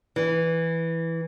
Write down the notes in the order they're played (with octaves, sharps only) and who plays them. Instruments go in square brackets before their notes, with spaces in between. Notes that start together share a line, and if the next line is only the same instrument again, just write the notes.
[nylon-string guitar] E3